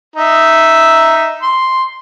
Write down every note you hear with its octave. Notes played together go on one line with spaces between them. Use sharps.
D#4 E5
C6